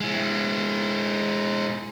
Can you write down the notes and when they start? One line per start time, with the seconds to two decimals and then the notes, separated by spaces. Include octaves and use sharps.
0.01 G#3 E4